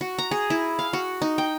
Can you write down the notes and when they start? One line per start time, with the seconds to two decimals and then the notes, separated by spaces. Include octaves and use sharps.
0.01 F#4
0.18 A#5
0.31 G#4
0.50 E4
0.79 F5
0.93 F#4
1.22 D#4
1.38 G5